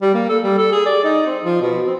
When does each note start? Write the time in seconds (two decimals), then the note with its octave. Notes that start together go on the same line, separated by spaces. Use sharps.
0.02 G3
0.14 A#3
0.29 A4
0.43 G3
0.58 A4
0.72 G#4
0.86 D5
1.04 D#4
1.27 C4
1.44 F3
1.62 B2
1.87 C4